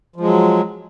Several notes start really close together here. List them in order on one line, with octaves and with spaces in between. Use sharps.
F3 G#3 F#3